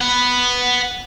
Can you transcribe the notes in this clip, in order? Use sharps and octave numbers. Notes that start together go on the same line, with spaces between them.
B4 F#5